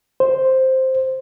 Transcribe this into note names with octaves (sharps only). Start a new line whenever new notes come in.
C5